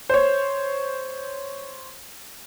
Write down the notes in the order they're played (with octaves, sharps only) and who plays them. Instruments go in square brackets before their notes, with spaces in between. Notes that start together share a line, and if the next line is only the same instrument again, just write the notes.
[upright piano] C5 C#5